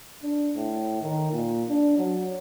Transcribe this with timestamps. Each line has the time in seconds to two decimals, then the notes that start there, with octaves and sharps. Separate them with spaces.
0.23 D4
0.56 A2
1.02 D#3
1.32 A#2
1.69 D4
1.98 F#3